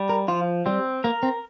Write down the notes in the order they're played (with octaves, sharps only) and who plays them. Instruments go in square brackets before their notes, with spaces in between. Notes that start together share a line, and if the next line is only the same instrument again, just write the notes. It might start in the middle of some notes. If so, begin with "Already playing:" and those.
Already playing: [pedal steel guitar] G3
[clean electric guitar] A#4
[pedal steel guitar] F3 [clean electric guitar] F4
[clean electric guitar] G3 [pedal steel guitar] C4
[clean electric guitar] A#3 [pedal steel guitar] A#4
[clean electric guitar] C4